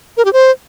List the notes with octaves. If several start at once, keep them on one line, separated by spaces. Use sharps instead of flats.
A#4
G4
C5